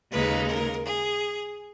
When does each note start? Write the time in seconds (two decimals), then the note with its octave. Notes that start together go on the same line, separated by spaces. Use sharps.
0.11 D#2 C#3 G#3 D#4 B4
0.49 A#4
0.85 G#4